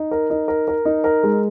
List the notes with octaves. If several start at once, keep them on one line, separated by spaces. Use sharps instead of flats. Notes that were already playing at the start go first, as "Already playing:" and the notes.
Already playing: D#4
A#4
D#4
A#4
A#4
D#4
A#4
G#3